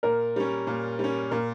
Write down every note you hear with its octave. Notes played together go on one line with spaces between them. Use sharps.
A#2 A#4
G3 C#4
A#2
G3 C#4
A#2 A#4